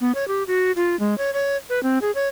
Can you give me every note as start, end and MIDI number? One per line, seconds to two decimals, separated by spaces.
0.01 0.12 59
0.15 0.27 73
0.28 0.43 67
0.47 0.72 66
0.76 0.98 65
1.00 1.17 56
1.18 1.33 73
1.34 1.57 73
1.70 1.82 71
1.83 1.98 60
2.02 2.11 68
2.15 2.28 73